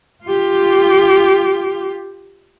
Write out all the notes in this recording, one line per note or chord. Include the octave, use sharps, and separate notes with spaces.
F4 G4